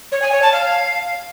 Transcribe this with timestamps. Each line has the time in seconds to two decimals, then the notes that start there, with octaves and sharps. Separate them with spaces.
0.12 C#5
0.22 G#5
0.32 C#5
0.42 A5
0.52 F5